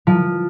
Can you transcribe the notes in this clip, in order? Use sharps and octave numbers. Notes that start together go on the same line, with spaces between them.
F3